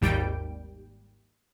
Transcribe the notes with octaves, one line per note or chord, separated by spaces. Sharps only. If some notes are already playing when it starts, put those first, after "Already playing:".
G#1 D#2 G3 G5 D7